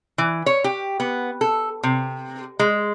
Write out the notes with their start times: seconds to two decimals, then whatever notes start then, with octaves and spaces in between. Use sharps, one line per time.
0.18 E3
0.46 C#5
0.64 G4
1.00 B3
1.41 A4
1.83 C3
2.59 G#3